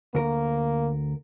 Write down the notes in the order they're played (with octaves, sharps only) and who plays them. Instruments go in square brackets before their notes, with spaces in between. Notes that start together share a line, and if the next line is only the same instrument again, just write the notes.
[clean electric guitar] D2 A#4 [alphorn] A#3